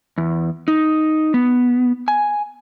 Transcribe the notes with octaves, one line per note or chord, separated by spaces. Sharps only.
E2
D#4
B3
G#5